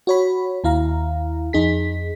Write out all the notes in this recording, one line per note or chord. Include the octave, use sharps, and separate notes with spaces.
F#4 C#5 B5
D#2 E4 F5 A#5
F2 D#4 G#4 B6